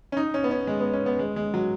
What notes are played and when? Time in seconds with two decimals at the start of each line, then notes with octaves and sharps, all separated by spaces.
0.12 C#4
0.17 D#4
0.34 C#4
0.44 B3
0.51 C#4
0.67 G#3
0.81 B3
0.93 C#4
1.06 B3
1.19 G#3
1.36 G#3
1.54 F#3